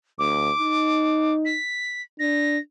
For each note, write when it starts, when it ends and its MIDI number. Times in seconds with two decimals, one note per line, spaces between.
0.19 0.50 38
0.19 1.34 86
0.59 1.56 63
1.45 2.02 95
2.19 2.58 62
2.19 2.58 94